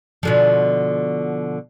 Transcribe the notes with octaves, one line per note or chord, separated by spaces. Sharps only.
B2 D3 F3